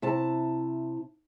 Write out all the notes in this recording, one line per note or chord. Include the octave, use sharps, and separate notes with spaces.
C3 E4 A5